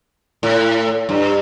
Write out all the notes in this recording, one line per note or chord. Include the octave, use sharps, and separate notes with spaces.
A2
G2